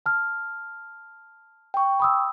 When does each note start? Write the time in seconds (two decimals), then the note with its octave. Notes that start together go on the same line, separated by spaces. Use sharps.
0.06 A5 F6
1.74 G5 C#6
2.00 B5 D#6 E6